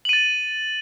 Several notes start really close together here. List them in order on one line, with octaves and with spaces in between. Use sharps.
F#7 D#7 A6